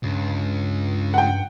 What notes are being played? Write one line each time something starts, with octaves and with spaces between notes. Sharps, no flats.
C#2 G2
F#5 G5